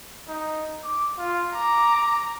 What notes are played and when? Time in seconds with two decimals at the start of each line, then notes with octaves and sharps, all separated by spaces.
0.29 D#4
0.83 D6
1.18 F4
1.56 A#5 D6